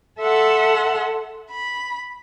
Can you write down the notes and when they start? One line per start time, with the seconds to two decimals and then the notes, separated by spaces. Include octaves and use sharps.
0.19 A4 E5 F#5 C6
1.51 B5